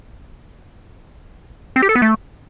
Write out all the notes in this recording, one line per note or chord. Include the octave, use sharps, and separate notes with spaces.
C4
G4
A4
B3
A3